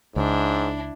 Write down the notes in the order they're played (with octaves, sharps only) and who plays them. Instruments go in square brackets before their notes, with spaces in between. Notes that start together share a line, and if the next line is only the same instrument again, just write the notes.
[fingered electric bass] C#2 [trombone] G#2 [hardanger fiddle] D4 E4